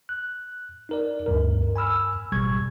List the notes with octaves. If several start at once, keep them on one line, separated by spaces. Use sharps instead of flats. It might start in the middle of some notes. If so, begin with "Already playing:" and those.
F#6
D#4 A#4 D5
D2 G2 A#4
G#5 B5 E6 F6
A1 B2 G3 C#6 G#6